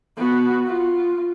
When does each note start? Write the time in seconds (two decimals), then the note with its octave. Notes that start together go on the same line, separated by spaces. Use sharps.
0.17 B3 F#4
0.67 F4